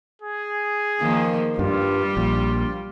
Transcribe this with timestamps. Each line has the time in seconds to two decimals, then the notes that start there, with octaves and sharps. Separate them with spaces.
0.22 G#4
1.00 D#3 F3 A#3
1.59 G2 G3 F4
2.17 A#1 F4